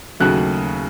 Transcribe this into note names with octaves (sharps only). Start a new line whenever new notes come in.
D#2 C#3 F#3 A3 F#6